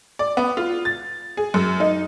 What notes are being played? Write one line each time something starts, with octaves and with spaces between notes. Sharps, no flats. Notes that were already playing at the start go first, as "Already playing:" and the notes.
D5
B3
F4
A6
G#4
F#2
D#4